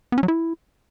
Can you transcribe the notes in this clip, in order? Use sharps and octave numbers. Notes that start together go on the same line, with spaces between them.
B3
C#4
F#3
E4